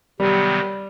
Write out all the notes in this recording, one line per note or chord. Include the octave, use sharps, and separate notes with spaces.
C3 D#3 F#3 G3 B3